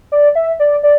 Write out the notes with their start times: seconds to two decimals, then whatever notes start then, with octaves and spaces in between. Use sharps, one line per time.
0.12 D5
0.35 E5
0.60 D5
0.83 D5